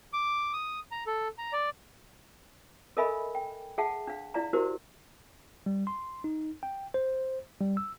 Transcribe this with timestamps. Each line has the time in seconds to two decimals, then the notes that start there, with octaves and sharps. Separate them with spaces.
0.13 D6
0.53 D#6
0.91 A#5
1.07 A4
1.38 A#5
1.53 D5
2.97 A4 A#4 D#5 E5 G#5 B5
3.35 G5
3.78 G#4 E5 F#5 A5
4.07 D4 F5
4.34 E4 D5 F5 A#5
4.53 E4 F#4 G4 A#4 C5
5.66 G3
5.87 C6
6.24 D#4
6.63 G5
6.94 C5
7.61 G3
7.77 E6